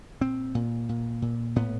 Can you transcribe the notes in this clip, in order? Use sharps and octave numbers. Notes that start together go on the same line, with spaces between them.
A#2 C4
A#2
A#2
A#2
A2 B3